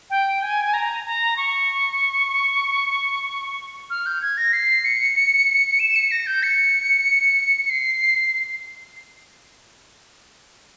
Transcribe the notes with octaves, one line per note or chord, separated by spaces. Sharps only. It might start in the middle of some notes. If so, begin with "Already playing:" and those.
G5
G#5
A#5
A#5
C#6
F6
G6
G#6
A#6
C7
C#7
E7
C#7
A#6
G6
C#7
C#7
C7